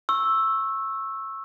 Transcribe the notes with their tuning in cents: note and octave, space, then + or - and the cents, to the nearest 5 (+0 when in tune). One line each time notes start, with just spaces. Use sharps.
C#6 -25 E6 +0